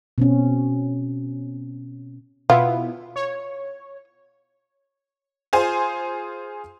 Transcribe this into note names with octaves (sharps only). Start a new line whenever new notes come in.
B2 C4 C#4
B2 B3 E4 F4
C#5
F4 G#4 C5 G#5 C6